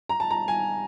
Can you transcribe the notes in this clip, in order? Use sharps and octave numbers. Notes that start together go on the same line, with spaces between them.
A#5
A5
A#5
G#5